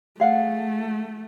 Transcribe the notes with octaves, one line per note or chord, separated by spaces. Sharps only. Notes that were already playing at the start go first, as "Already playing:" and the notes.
A3 G#4 F5 F#5